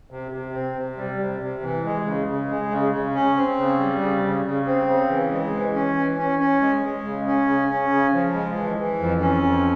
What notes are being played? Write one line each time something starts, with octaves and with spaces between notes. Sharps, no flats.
C3
C3
C4
C3
G3
C3
C3
E3
G#3
C#3
C#3
G#3
C#3
C#3
C#4
C4
C#3
G3
C#3
C#3
C#3
C4
C#3
E3
G#3
E3
C#4
E3
C#4
C#4
G#3
G#3
C#3
C#4
C#3
C#4
C#3
F3
G#3
E3
E3
F2
C#4
F2